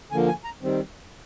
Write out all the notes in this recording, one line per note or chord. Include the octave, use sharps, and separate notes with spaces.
D3 F3 A#3 G#5
G#5
A#5
D#3 G3 C4